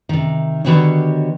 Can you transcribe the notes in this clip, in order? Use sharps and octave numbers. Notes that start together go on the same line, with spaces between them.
C3 D#3
D3 D#3 B3 F#4 G4 C#5